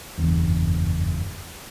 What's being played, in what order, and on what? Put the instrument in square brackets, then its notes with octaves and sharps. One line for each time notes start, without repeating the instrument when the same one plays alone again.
[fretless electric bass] F#1 E2 G2